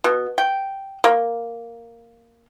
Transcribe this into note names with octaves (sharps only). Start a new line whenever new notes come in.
B2
G5
A#3